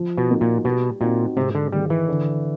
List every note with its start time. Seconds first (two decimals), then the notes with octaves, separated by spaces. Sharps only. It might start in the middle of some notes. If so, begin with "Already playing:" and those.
Already playing: F3
0.18 B2
0.29 A#3 D#4 F#4
0.41 A#2
0.65 B2 G3
1.01 A#2 C4 D#4 F#4
1.37 G#2 C3
1.55 D3
1.72 D#3 G3 G#3
1.90 E3
2.08 D3